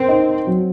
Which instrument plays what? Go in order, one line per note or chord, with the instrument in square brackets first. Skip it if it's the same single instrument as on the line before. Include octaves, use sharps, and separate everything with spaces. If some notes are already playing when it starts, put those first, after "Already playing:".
Already playing: [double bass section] C4 [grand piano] A#4
[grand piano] D#4
F#3